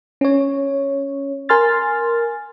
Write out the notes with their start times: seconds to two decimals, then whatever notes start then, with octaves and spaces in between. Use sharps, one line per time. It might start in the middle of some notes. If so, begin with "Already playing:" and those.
0.21 C#4 C#5
1.49 A#4 G#5 C6 F6 A6